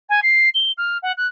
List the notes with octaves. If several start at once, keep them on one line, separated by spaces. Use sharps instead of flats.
G#5
C7
G7
F6
F#5
F#6